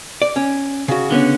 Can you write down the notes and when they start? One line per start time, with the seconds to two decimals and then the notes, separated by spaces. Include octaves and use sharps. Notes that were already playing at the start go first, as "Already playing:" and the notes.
0.22 D5
0.36 C#4
0.88 C#3 F#4
1.10 D3 B3 C#4